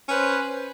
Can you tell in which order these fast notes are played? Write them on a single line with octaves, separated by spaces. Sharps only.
C#4 B4 C5